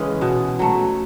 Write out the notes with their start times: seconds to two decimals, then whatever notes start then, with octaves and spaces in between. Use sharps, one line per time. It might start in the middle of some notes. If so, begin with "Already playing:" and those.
Already playing: C#3 E3 G#3 C#4
0.21 B2
0.59 F#3 A3